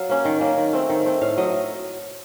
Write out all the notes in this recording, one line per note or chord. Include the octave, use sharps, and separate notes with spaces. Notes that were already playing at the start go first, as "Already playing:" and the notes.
Already playing: F#3 F5
A#3 C#4
D#3
A#3 C#4
D#3
A3 C4
D#3
A3 C4
A2 F5
F#3 A3 D#5